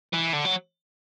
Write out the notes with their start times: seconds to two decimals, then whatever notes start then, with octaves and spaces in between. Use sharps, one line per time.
0.13 E3
0.33 D3
0.45 F#3